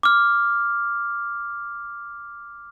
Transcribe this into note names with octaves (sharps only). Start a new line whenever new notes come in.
D6 F6